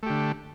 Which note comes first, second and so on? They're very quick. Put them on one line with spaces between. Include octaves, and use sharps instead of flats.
A3 G4 D3